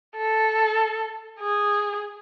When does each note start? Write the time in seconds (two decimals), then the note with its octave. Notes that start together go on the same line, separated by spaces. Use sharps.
0.16 A4
1.40 G#4